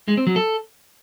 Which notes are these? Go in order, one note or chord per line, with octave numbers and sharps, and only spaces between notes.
G#3
C4
F#3
A4